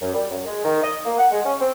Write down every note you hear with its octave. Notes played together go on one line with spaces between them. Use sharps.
F#2
G3
F#2
G#3
D#3
D#5
A#3
F#5
G#3
C#4
C4